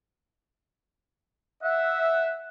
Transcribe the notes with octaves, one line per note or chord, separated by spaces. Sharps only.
E5 F#5